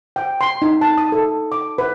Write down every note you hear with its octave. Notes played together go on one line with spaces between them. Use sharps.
G5
C6
D#4
A5
D#6
A4
D6
B4